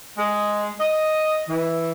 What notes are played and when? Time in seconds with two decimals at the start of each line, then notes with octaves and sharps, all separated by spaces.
0.18 G#3
0.79 D#5
1.48 E3